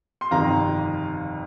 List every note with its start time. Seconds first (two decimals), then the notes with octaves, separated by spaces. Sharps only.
0.21 C6
0.31 G1 F2 C3 D#3 F5 A#5